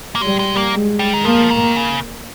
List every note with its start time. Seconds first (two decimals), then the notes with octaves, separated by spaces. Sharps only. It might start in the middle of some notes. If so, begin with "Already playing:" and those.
0.15 A#3
0.21 G3 G#3
0.39 G#3
0.56 A#3
0.74 G#3
0.99 G3
1.13 D#3
1.25 F3 A#3
1.51 D#3
1.76 C#3